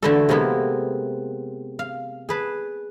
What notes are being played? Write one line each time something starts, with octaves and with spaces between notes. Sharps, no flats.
D3 E3 A3 E4 F#4 A4
C3 G#3 A#3 B3 E4
F5
G#4 B4 A5